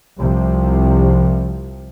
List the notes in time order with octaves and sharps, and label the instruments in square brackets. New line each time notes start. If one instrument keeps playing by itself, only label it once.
[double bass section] C2 C3 F3